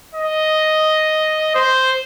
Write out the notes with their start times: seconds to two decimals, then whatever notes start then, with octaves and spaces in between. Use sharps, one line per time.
0.14 D#5
1.55 C5